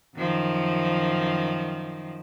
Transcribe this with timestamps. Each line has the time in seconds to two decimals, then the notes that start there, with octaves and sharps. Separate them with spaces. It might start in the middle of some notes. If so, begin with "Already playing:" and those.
0.17 F#2 D#3 F3